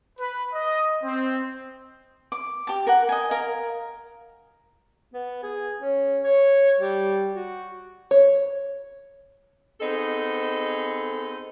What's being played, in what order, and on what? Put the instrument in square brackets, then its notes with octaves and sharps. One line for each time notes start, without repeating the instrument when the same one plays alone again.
[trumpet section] B4
D#5
C4
[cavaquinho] D6
G4 A5
A#4 F#5
D#5 G#5
A#4 F5
[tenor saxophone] B3
G#4
C#4
C#5
G3
F#4
[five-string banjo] C#5
[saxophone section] B3 C4 D#4 G#4 A4